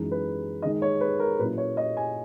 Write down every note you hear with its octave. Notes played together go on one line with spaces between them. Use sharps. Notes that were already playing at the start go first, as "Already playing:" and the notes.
Already playing: F#2 E3 G#3 D#4
B4
D#3 G#3 D#4 D#5
C#5
B4
A#4
A#2 F#3 C#4 E4 B4
C#5
D#5
G#5